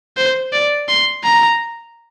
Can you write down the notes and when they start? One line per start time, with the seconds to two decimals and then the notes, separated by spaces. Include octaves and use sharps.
0.17 C5
0.53 D5
0.88 C6
1.24 A#5